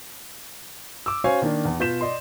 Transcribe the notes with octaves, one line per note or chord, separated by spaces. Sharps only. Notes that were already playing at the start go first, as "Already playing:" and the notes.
D6 E6
C#4 F#4 C5 C#5 F5 G#5
D#3 A#3 D4
E2
B2 F4 B4 G6 B6 E7
D5 D#5 C6